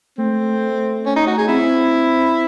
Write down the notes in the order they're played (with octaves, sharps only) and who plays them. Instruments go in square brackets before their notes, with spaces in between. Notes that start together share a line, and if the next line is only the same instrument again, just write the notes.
[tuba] A3 [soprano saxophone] C4
[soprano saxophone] C#4
D#4
F#4
G#4
[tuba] C4 [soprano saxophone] E4